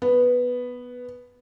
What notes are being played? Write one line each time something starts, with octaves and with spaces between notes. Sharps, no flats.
B3